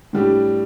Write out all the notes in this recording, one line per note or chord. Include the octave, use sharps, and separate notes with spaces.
A2 G3 D4 G4